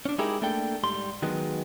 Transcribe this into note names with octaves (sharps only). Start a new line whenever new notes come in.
C#4 D4
G#3 D#4 E4 G4 G#4 A#4
A3 A#3 D4 A4 G5
G#2 G3 C6
D#3 F#3 G#3 B3